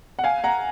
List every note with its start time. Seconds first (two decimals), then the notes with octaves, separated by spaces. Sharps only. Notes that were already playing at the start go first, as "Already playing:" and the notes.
0.19 F#5
0.24 F5 G#5
0.44 F#5 A#5